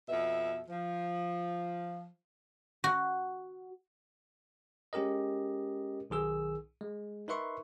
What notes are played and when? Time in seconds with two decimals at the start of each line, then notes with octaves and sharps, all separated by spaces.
0.08 F2 B2 E5
0.68 F3
2.84 F#4
4.93 G#3 C#4 G4 A#4 D#5
6.10 B1 D#3 G#4 E6
6.81 G#3
7.28 D#4 A#4 B4 E5 C6 C#6